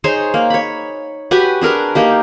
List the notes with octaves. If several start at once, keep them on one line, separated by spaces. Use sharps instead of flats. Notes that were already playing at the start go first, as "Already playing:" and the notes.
D#4 G#4 C5 C#5
A#3
C#5 B5
F#4 G4 B4 G#5
D4 G#4 A#4 B4
A#3 D#4 G4